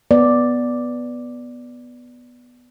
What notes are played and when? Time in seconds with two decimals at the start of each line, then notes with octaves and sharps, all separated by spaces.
0.11 B3 D5